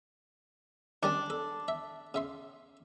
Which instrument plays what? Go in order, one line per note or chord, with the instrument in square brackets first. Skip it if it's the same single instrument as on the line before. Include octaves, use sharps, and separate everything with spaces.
[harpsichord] D#3 G3 C#4 [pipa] D4
[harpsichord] A4
E5
C#3 E5 C6